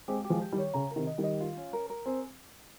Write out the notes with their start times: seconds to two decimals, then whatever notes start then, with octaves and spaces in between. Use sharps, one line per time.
0.08 G#3 C4 G4
0.24 G4
0.30 F3 G#3
0.41 G4
0.52 D#3 G3
0.58 C#5
0.74 C#3 A#5
0.91 A#4
0.96 C3 D#3
1.07 D#5
1.18 D#3 G3
1.24 D#5
1.40 F4
1.57 C#4
1.73 A#4
1.90 A#4
2.06 C4 G#4